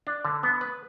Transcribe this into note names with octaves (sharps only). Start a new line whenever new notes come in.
D4
D3
B3
B4